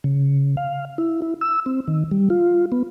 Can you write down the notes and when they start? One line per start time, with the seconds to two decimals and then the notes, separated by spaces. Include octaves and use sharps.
0.04 C#3
0.57 F5
0.98 E4
1.22 E4
1.41 E6
1.66 C4
1.88 D#3
2.11 G3
2.30 F4
2.72 B3